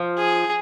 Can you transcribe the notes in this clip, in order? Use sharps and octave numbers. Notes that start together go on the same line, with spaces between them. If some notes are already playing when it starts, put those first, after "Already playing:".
Already playing: F3
G#4